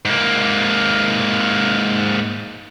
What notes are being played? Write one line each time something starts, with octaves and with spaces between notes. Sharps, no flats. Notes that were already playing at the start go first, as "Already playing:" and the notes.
G#2 A#3